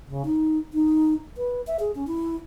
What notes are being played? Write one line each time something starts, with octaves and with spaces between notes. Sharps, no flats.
C#3
D#4
D#4
B4
E5
G#4
C#4
E4